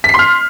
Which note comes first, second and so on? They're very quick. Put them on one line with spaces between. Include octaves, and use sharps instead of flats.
B6 C7 C6 F6